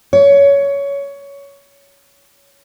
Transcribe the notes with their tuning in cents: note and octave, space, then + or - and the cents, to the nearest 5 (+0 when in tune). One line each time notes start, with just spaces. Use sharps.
C#5 +15